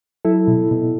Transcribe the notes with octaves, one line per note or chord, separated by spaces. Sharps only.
F#3 E4 A4
B2
B2